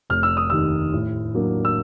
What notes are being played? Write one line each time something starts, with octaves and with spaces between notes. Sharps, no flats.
F1 F6
E6
D#6
D#2 D#3 E6
A2
F#3 A#3 D4
E6